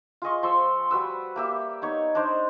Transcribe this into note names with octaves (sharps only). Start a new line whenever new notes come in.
F4 G#4 D#5 C#6
F3 C6 C#6 E6
G3 F#4 B4 E6
A#3 G4 E5
B3 D#4 C#5
D4 D#4 C5 D5